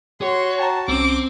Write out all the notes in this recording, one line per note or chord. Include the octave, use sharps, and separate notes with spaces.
F#4 C#5 C6
G5 A5 A#5
C2 C4 C#4 D6